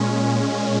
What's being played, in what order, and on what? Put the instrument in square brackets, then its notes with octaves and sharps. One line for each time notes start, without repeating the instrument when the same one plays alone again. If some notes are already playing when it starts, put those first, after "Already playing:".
Already playing: [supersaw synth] A#2 G#3 C#4